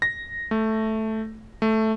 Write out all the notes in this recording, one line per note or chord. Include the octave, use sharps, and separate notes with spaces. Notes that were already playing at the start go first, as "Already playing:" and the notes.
A#6
A3
A3